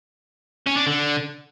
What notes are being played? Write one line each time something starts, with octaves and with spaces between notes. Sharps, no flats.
C#4
D4
D3